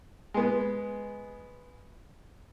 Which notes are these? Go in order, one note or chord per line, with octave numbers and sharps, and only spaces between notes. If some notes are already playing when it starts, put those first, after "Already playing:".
G#3 B3